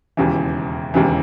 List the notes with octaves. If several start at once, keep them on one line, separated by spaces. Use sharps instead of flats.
E1 D#2 C#3 E3
E1 D#2 C#3 E3